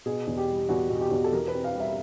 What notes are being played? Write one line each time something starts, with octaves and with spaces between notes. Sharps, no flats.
B2 G#4
E2
G4
G3
E2 F#4
B2
G4
E2
A4
E3 A#4
B4
C4
F5
G3 E5